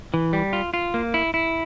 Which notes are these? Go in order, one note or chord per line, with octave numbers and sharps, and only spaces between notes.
E3
G3
F4
F4
A#3
E4
E4